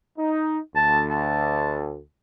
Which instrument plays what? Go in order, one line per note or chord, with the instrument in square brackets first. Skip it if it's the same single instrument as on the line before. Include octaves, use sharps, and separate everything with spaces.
[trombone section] D#4
[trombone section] D2 [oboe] A5
[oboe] A5